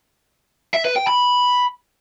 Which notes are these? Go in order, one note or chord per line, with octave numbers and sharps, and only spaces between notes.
E5
B4
G5
B5